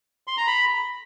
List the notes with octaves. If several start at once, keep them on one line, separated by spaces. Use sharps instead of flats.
C6
A#5
B5